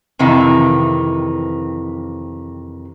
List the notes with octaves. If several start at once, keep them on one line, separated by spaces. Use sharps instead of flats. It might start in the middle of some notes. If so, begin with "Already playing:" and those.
F2 C3 D#3 E3